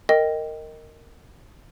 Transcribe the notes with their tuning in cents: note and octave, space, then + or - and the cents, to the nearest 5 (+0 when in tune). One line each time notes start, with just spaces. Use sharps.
A#4 -15 D#5 +0 G5 +0